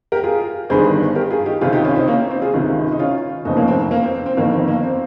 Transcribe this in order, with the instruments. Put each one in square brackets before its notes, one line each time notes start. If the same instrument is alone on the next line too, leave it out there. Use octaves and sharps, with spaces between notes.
[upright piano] G4 A#4
F4 G#4
G1 G2 D#3 G#4 C5
G4 A#4
F4 G#4
D#4 G4
C#2 C3 D#3 F4 G#4
D#4 G4
C#4 F4
C4 D#4
A#3 C#4
C4
C4
F4 G#4
C#2 C3 D#3
D#4
C#4 F4
F1 D#2 C#3 C4 D#4
A#3 C#4
C4
C4
A#3
C4
C4
C4
G1 F2 D#3 A#3
C4
A#3
C4